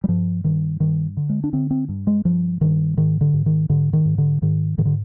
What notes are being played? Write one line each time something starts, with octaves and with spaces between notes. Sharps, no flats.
G3
G2 F3
G2 D#3
G2 D#3
D3
G#3
D4
D3 C4
C4
G2
G#3
G2 F3
G2 D#3
G#2 D#3
D3
G#2
D#3
G#2 D3
D#3
G#2
D3
G#2 D#3
G#2 D#3
D3